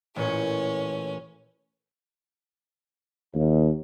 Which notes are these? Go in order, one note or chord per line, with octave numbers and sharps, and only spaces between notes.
A1 A#2 C#4 C#5
D#2